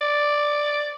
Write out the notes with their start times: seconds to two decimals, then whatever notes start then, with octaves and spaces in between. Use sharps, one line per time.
0.01 D5